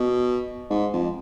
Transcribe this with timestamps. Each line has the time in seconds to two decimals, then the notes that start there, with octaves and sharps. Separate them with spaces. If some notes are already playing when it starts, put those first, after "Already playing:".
Already playing: B2
0.70 G#2
0.93 F2